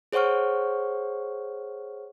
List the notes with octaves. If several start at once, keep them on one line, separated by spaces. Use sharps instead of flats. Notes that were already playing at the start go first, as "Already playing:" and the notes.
G#4 C5 C#5 F#5 C#6 F6